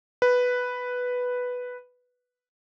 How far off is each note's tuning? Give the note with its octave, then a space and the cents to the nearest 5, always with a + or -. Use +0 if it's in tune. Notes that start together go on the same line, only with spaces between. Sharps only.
B4 +0